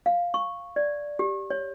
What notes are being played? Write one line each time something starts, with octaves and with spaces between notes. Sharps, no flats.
F5
C#6
D5
G4
C#5